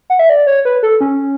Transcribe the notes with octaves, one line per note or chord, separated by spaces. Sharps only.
F#5
E5
D5
C#5
B4
A4
C#4